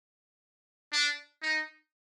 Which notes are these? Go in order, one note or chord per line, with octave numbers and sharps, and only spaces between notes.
D4
D#4